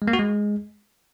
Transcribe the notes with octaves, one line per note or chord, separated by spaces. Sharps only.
G#3
A#3
F#4
G#3